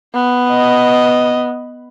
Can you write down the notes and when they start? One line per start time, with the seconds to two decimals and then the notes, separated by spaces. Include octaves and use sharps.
0.14 B3
0.49 D#5